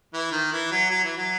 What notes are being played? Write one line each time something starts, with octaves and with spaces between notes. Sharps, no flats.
E3
D#3
E3
F#3
F#3
E3
F#3